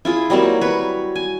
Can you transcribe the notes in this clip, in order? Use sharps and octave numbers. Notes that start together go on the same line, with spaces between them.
E4 F4 G#4
F#3 G3 A#3 C4
B4 C#5
G#5